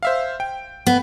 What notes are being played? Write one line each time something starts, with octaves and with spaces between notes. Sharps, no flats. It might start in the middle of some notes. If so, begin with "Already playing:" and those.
C5 E5 F5
G5
B3